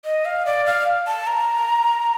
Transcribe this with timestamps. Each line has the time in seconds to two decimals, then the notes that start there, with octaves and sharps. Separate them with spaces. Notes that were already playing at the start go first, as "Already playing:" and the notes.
0.05 D#5
0.25 F5
0.46 D5
0.66 F5
1.07 A5
1.27 A#5